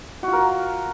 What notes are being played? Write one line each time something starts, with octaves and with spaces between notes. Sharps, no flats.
F4 F#4 A#4